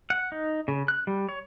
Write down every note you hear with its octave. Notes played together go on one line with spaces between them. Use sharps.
F#5
D#4
C#3
F#6
G3
C#5